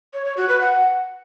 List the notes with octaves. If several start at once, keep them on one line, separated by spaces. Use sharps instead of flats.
C#5
C#5
F#4
B4
F#5